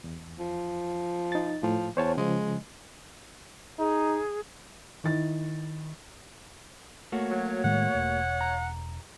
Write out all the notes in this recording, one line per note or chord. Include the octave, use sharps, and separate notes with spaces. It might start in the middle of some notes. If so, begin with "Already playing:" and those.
E2
F3
D#4 A6
A2 F3
E2 C5 C#5 A5
C#3 F3 G#3
D#4 G#4
D#3 D#4 E4 A6
A3 A#3 F#4 C#5
F#3
A2 D#3 G#3 F#5
E1
A#5